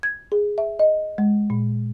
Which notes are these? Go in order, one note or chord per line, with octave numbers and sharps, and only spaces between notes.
G#6
G#4
E5
D#5
G#3
A#2